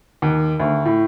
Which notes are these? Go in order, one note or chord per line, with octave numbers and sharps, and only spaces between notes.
D#2
D2
A2